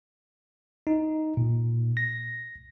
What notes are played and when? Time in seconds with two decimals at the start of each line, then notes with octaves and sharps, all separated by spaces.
0.87 D#4
1.37 A#2
1.97 A#6